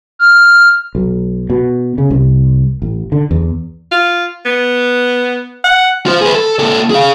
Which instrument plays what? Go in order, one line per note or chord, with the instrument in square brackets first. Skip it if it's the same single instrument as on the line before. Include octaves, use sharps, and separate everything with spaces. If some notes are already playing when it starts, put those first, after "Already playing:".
[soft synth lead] F6
[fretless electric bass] B1
B2
C#3
C2
A1
D3
E2
[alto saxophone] F4
B3
F#5
[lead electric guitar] F4 C5
G#4 B4
A4
A#2 A4
G#4 F5